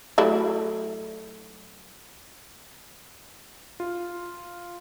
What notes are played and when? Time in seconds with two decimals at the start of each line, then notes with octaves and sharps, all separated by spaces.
0.18 F#3 A3 E4
3.80 F4